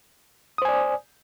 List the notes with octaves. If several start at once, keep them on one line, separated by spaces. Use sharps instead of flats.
C5 D5 G#5 D#6